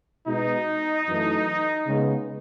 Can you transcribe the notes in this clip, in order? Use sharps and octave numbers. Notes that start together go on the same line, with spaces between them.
B2 G#3 B3 D#4
F#2 E3 A3
C#3 G#3 B3